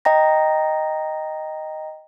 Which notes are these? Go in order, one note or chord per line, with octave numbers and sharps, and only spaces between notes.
D#5 G5 A#5 A#6